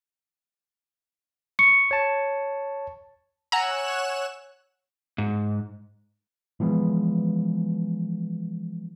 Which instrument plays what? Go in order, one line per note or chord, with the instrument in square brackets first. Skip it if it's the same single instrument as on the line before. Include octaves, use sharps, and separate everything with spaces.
[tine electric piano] C#6 [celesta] C#7
[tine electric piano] C#5 A5
[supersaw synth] C#5 F#6 E7 [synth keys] F#5 G#5 E6 [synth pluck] A#5
[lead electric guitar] G#2
[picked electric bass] E3 F3 G#3 B3